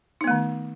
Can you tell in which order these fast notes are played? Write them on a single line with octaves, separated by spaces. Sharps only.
D#4 B3 A3 D#3